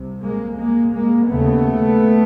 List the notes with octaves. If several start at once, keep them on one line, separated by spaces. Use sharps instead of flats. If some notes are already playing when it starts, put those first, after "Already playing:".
Already playing: C2 C3
G#3 A#3
G#3 A#3
G#3 A#3
D#2 C#3 A3 B3